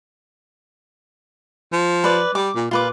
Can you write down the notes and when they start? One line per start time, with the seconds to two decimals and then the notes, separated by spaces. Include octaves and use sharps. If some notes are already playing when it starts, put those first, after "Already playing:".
1.72 F3
2.04 B4 D5
2.35 G3 D6
2.56 A#2
2.71 A#2 F4 B4 D6